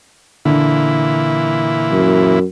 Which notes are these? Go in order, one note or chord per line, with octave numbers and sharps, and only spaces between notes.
A#2 D3 E3 E4
F#2